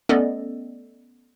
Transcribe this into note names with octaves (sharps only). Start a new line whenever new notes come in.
A3 B3 C#4 A4 D5 D#5